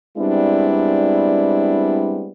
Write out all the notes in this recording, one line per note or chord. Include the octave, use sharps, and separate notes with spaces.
G3 G#3 B3 C4 D4 E4